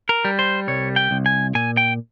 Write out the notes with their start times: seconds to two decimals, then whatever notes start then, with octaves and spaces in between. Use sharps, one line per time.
0.09 A#4
0.25 G3
0.39 C5
0.68 C2 C#5
0.96 G5
1.11 C2
1.26 G#5
1.55 A#2 G#5
1.77 G5